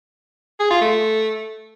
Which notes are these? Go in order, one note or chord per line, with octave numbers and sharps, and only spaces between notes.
G#4
F4
A3